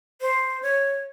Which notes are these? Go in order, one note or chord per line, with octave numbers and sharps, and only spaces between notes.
C5
C#5